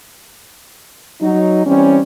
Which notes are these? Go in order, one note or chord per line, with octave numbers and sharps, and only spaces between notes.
F#3 D#4
E3 G3 C4 C#4